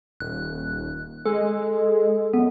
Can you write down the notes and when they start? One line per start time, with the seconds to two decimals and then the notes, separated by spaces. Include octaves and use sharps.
0.20 D#1 F#6
1.26 G#3 A4
2.34 F#2 B3